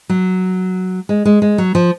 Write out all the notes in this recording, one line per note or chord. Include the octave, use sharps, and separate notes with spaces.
F#3
G#3
G#3
G#3
F#3
F3